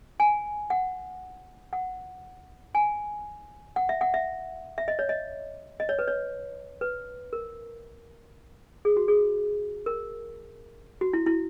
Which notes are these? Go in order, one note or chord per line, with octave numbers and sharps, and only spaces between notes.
G#5
F#5
F#5
G#5
F#5
E5
F#5
E5
E5
D#5
C#5
D#5
D#5
C#5
B4
C#5
B4
A#4
G#4
F#4
G#4
A#4
F#4
E4
E4